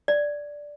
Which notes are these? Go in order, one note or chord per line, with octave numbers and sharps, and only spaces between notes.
D5